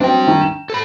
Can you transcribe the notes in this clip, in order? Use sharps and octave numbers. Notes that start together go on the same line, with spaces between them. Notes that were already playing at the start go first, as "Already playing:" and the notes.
F#3 C4 D4 G5
D#3
E7
A4 B5